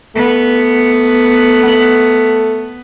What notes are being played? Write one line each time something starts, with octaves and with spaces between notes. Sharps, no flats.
A3 B3